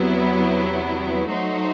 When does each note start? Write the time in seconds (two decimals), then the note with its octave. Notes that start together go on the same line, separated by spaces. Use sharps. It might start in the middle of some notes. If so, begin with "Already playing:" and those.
Already playing: E2 C3 F#3 B3 E4
1.29 F#3 A3 D#4 F#4 C5